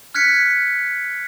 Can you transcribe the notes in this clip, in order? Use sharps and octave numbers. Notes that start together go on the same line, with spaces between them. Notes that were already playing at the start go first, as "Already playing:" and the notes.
F6 F#6 G#6 B6 C#7